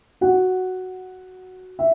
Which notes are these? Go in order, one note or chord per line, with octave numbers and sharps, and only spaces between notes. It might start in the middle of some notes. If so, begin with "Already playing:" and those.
F#4 F#5
E5